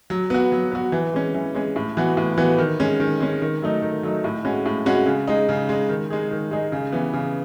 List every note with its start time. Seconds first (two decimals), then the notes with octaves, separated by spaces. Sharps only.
0.10 F#3
0.30 B3 F#4
0.52 F#3
0.72 B3 F#4
0.92 E3
1.13 G#3 C#4
1.34 E3
1.55 G#3 C#4
1.76 A2
1.97 E3 B3 F#4
2.17 A2
2.37 E3 B3 F#4
2.58 D#3
2.80 G#3 C#4
3.00 D#3
3.20 G#3 C#4
3.42 D#3
3.62 F#3 A3 D#4
3.82 D#3
4.03 F#3 A3 D#4
4.24 A2
4.45 G#3 C#4 F#4
4.66 A2
4.86 G#3 C#4 F#4
5.06 C#3
5.27 G#3 D#4
5.49 C#3
5.69 G#3 D#4
5.89 D#3
6.10 G#3 D#4 G#4
6.31 D#3
6.51 G#3 D#4 G#4
6.72 C#3
6.92 E3 B3
7.13 C#3